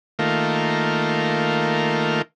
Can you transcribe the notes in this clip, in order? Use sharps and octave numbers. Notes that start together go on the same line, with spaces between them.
D#3 A3 A#3 F4